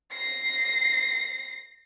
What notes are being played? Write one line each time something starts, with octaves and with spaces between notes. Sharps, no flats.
A#6 C7